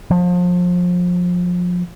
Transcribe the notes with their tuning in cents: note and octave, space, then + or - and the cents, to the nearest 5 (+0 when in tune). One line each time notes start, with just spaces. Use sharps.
F3 +30